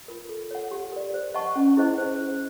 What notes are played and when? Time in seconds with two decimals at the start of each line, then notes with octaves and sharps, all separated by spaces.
0.08 F4 A#4
0.29 A4
0.51 C#5 F#5
0.71 G4
0.92 A#4 D5
1.14 C5
1.34 D#5 F#5 A5 C#6
1.56 C#4
1.77 E4 G#4 C5 D#5
1.98 C5